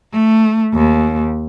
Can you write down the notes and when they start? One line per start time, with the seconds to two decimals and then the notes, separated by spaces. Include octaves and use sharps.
0.13 A3
0.74 D#2